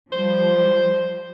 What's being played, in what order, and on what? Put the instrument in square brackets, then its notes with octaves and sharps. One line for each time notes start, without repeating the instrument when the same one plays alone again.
[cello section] F3 G3 [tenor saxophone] C5